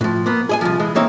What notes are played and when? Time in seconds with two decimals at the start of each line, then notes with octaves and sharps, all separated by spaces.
0.01 A2 F3
0.26 A#3 B3
0.49 G#4 D#5 G#5
0.61 C2 F#2 F3
0.79 E3 G#3
0.95 A#3 C4 D#4 C#5 E5 G5